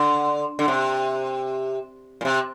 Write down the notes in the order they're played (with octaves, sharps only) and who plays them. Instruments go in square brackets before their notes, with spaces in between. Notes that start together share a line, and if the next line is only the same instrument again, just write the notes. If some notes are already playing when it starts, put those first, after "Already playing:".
Already playing: [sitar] D3
D3
C3
A#2
C3